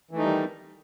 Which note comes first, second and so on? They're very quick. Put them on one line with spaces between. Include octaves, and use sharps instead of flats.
E3 A3 D#4 G3 D#3